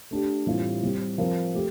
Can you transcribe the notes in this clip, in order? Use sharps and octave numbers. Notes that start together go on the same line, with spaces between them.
A3 D4 G4
A2 E3 G3 C4 F4
G3 C4 G4
F3 C4 F4 A#4
A3 G4